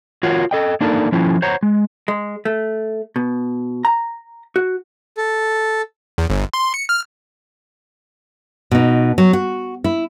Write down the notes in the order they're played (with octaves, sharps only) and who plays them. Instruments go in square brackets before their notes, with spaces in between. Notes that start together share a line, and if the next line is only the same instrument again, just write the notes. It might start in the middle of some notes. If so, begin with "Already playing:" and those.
[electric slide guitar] F4 F#4 A#4 C#5 F#5
A4 D#5 G5
A#3 D4 D#4 A4 A#4
F3 C#4 E4 F4
C5 C#5 F#5 A#5
G#3
[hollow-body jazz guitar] G#3
A3
B2
A#5
F#4
[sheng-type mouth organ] A4
[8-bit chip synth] E2
G1
C6
C#7
F6
[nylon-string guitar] B2 D#4
F#3
F#4
E4